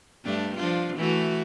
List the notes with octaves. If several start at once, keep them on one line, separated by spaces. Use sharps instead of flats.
G2 A3 D4
F3 D4 F4
E3 A3 F#4